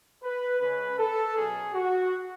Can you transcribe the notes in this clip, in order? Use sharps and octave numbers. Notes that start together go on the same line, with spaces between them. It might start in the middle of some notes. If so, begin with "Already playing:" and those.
B4
C#3 G#3 C#4 B4
A4
B2 F#3 C#4 G#4
F#4